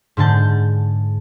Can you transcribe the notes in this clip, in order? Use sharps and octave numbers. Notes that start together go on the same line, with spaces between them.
G#2 D3 G#4 A5 G6